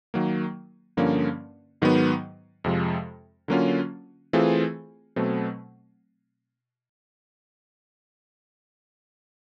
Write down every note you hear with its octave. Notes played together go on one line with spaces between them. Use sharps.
D#3 F#3 A#3
G2 D3 F3 A#3 C#4
G#2 D#3 F#3 B3
F2 C3 F3 G#3
D3 F#3 A#3 C#4 F4
E3 A3 C4 F4 G#4
B2 F#3 A3 C4